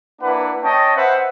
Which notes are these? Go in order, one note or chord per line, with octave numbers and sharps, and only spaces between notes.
A#3 D4 E4 B4 F#5
C#4 D#5 G5 A5
B4 C5 E5 F#5